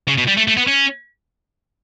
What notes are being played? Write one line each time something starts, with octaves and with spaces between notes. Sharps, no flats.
C#3
B2
G3
A3
A3
B3
C#4